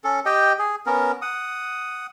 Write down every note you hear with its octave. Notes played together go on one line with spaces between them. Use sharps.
C#4 A4
G4 D#5 G5
G#4
B3 C#4 A#4
F#5 D#6